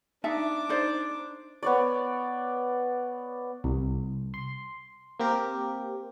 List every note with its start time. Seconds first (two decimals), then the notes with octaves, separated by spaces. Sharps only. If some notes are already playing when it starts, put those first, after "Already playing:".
0.24 D4 D#4 E5 A5 D6
0.69 D#4 C5 D5
1.63 B3 C#5 D5
3.64 C2
4.34 C6
5.19 A#3 C4 G4 A#4